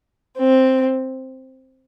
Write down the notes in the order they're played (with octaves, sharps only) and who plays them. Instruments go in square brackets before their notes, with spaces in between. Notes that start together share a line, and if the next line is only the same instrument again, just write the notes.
[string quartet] C4